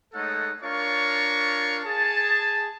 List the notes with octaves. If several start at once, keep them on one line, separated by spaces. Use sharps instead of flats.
G#3 A3 D#4 A4 C#5 F#5
D4 F4 A#4 C#5 F5 C#6
G#4 A5